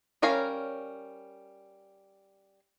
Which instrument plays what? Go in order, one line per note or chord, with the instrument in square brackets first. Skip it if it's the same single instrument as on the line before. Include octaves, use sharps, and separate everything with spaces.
[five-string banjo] G3 C#4 A#4 C#5 F5